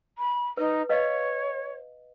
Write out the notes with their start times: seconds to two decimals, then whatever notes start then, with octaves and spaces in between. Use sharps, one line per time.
0.18 B5
0.57 D#4 B4
0.89 B4 C#5 D#5 F5